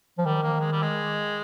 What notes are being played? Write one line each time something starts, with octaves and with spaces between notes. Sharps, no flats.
F3
D#3 G3
A#3
G#3
G3
G#3